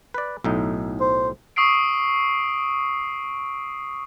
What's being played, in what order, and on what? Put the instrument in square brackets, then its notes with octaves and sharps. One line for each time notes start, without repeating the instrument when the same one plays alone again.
[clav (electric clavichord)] B4 D5
B1 A2 D#4
[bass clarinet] C5
[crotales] C#6 D#6 E6 C7 D7